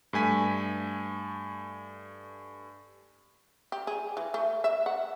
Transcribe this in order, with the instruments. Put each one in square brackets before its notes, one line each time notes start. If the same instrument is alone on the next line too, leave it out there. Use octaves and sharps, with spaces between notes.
[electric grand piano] G2 A3 G#5 B6
[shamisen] G4
G#4
E3
A3
E5
F#5